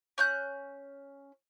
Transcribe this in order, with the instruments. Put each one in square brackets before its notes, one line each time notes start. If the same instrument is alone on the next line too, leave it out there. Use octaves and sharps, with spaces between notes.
[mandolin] C#4 F#6 G6